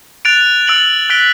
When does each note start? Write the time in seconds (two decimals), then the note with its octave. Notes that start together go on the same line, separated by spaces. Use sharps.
0.25 F#6 A6 D7 F7
0.67 E6 A6 D7 F#7
1.10 F#6 B6 D7 G7